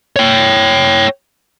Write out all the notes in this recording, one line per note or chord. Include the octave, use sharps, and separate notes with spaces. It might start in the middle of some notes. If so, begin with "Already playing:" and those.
C#5 G5